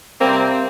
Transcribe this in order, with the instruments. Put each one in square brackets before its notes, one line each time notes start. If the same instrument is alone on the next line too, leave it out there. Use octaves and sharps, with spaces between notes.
[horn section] C3 G3 A#3 C4